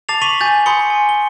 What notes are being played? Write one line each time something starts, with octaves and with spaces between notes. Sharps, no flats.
A5 D6 A6 C7 F7
C#6 B6 D#7 F7 F#7
G#5 G6 A6
B5 C6 D#6 C#7 G7
G#5
G7